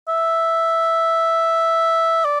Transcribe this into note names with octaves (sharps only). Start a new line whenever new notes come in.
E5
D5